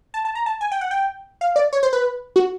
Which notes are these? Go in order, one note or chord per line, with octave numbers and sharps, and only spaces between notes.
A5
A5
A#5
A5
G#5
G5
F#5
G5
F5
D5
C#5
C5
B4
F#4